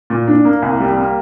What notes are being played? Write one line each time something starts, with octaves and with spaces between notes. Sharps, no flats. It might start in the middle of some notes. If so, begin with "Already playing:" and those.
A#2
D4
A#3
C2
G3
A#3